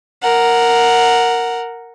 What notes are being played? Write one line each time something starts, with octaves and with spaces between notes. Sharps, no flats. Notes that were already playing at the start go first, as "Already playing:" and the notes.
A#4 F#5